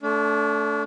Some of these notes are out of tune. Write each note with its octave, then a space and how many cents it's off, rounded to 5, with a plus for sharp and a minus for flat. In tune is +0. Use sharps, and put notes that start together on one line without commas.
A3 +0 D4 -35